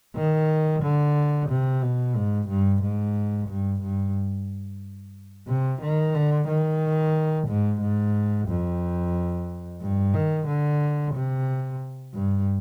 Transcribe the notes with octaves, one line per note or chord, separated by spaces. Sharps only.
D#3
D3
C3
B2
G#2
G2
G#2
G2
G2
C3
D#3
D3
D#3
G#2
G#2
F2
G2
D#3
D3
C3
G2